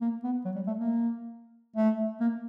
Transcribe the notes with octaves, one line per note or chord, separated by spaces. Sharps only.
A#3
B3
F#3
G3
A3
A#3
A3
A#3